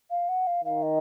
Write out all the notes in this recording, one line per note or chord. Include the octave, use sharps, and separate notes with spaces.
F5
F#5
F5
D#3 F5
D#5